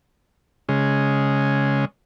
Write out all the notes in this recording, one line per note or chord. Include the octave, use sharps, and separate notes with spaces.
C#3 G#3